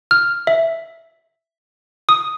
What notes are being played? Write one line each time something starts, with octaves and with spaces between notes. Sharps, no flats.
F6
E5
D#6